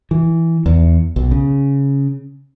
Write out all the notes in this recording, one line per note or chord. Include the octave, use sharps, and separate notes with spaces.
E3
E2
B1
C#3